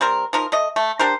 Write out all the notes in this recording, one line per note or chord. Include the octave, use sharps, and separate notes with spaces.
G3 C4 A#4
F3 D#4 A#4
A3 D#5
A3
D4 G4 A#4 C5